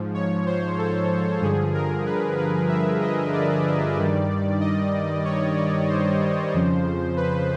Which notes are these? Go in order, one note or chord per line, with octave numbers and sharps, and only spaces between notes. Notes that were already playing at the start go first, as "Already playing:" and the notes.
Already playing: G#2 F3
C#5
C5
A4
G2 D3 F3 G#4
A#4
B4
B4
E5
D#5
D5
G2 D#3 G3
D#5
C#5
D5
C5
F2 C#3 F3
B4